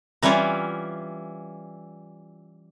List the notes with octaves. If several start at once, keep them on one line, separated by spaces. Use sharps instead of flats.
E3 G3 C#4 E4 F4